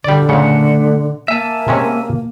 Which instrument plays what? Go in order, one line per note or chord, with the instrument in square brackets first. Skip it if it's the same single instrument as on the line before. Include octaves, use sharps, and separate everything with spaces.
[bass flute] D3 [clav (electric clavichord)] G3 D5
[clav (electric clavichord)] A#2 C#3 [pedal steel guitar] A3 F#5
[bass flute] A#3 [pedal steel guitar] E5 G#5 A5
[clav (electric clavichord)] C3 G#3 C#4